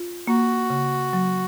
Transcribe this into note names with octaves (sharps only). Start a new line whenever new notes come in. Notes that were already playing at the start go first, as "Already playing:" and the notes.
Already playing: F4
A#3 F#4
C#3
F#3